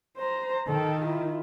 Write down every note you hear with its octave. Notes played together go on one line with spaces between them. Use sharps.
C5 A#5
D#3 A4 G5
E4 F4